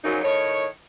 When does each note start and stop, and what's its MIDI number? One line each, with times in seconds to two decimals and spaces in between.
0.04 0.19 42
0.04 0.19 49
0.04 0.19 53
0.04 0.19 54
0.04 0.19 63
0.24 0.66 45
0.24 0.66 51
0.24 0.66 73